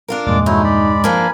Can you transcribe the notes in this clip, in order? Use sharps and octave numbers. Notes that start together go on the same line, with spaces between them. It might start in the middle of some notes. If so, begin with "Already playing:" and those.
D4 F4 A#4
E2 G2 A#2 G#3 D5 D6
F#3 A3 D#4 E4
D5 B5
F3 A#3 D4 A#4 G#5 B5